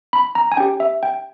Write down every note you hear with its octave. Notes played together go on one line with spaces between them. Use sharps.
B5
A#5
G#5
C#4 G4 G5
E5
G5